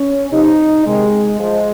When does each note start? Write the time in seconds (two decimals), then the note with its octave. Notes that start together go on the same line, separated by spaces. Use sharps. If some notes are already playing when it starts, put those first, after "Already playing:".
Already playing: C#4
0.31 C3 F3 D#4
0.86 C3 D#3 G#3
1.40 F3 G#3